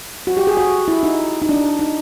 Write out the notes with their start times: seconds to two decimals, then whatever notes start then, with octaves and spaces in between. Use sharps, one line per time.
0.27 F#4
0.37 G4
0.47 G#4
0.57 F#4
0.88 E4
1.03 D#4
1.42 D#4
1.49 D4
1.79 D#4